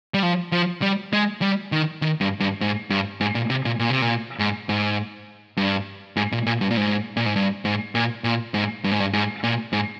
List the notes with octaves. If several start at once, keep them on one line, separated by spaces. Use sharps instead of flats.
G3
F3
F3
G3
G#3
G3
D#3
D#3
G2
G2
G#2
G2
G#2
A#2
C3
A#2
A#2
C3
A#2
G#2
G#2
G2
G#2
A#2
A#2
G2
A#2
G#2
A#2
G#2
G2
G#2
A#2
A#2
G#2
G2
G#2
G2
G#2
A#2
G#2